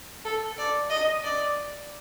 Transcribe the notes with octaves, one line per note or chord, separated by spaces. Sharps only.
A4
D5
D#5
D5